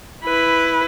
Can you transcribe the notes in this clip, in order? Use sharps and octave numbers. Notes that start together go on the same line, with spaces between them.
E4 B4